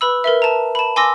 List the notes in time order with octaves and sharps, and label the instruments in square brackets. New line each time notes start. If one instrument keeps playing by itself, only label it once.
[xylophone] B4 B5 E6
A#4 B4 E5
A5 A#5
A5 B5
G#5 C6 D6 E6 A#6